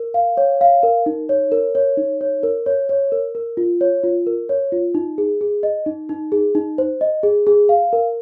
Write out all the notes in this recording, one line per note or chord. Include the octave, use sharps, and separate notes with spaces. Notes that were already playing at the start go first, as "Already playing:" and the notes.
Already playing: A#4
F5
C#5
F5
A#4
D#4
C#5
A#4
C#5
D#4
C#5
A#4
C#5
C#5
A#4
A#4
F4
C#5
F4
A#4
C#5
F4
D#4
G#4
G#4
D#5
D#4
D#4
G#4
D#4
C5
D#5
G#4
G#4
F5
A#4